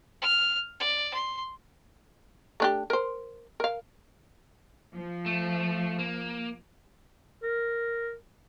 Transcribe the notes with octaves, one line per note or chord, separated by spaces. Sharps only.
F6
D5
C6
A3 D4 G4
A#4 C5
A#4 F5
F3
A3
A#3
A#4